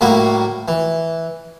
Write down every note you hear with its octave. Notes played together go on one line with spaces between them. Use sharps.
A2 G3 A#3 E4 F#4
E3